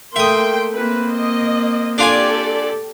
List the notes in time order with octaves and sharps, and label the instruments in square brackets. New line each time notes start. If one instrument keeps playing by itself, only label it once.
[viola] A3 [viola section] A#3 G5 C6 [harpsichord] E5 D#6
[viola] A#3 C4 [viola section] B4
[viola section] D#5
[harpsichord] D4 F4 G#5 [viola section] G4 A4 D5